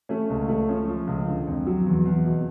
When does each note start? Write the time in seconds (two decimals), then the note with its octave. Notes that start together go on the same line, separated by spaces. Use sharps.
0.09 A3 C#4
0.30 C#2
0.49 A3
0.69 F3 C#4
0.88 F3
1.07 C#2
1.27 D3
1.47 F2
1.67 F#3
1.87 E2
2.05 E2
2.26 B2